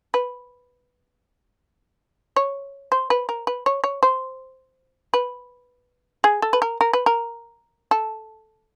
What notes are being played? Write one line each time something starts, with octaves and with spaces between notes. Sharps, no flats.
B4
C#5
C5
B4
A#4
B4
C#5
C#5
C5
B4
G#4
A4
B4
A#4
A#4
B4
A#4
A4